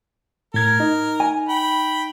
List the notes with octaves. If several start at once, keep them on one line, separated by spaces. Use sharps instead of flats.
A2 A#4 G#6
D#4
G#5
G5 B5